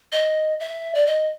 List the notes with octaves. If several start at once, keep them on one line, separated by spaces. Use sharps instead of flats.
D#5
E5
D5
D#5